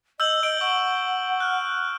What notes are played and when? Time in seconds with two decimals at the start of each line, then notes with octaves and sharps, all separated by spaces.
0.20 D#5 E6 G6 F#7
0.43 D#5 E6 D7 G7
0.61 F#5 C#6 E6
1.40 F6 F#6